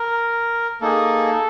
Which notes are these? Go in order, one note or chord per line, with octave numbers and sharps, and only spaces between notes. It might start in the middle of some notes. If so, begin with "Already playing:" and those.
Already playing: A#4
A#3 D#4 G#4 A4